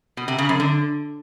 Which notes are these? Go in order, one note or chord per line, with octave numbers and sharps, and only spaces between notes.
B2
C3
C#3
F#2
D3